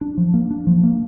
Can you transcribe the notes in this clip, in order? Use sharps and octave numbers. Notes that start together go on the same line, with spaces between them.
D4
F3
A#3
D4
F3
A#3